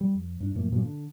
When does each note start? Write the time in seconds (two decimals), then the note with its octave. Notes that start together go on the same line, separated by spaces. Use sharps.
0.01 G3
0.14 F2
0.40 G2 D4
0.55 F#2 A2 F3 A#3
0.72 G2 A#2 F#3 B3
0.85 D3